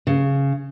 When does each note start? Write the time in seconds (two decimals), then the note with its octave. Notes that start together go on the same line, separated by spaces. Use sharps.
0.07 C#3